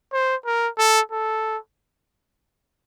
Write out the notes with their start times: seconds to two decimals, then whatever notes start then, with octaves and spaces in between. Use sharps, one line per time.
0.13 C5
0.46 A#4
0.78 A4
1.12 A4